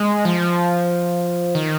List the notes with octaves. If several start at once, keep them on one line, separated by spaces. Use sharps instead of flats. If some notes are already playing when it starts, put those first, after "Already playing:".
Already playing: G#3
F3
D#3